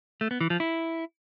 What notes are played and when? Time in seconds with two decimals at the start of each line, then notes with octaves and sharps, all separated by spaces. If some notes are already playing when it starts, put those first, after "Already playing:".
0.21 A3
0.31 B3
0.41 E3
0.50 F3
0.60 E4